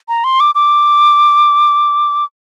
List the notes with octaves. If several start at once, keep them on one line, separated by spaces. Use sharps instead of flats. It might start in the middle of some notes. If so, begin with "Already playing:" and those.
A#5
C6
D6
D6